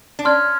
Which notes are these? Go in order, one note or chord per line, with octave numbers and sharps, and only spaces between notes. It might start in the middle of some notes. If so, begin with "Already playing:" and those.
D4
C#4 C6 F6 G#6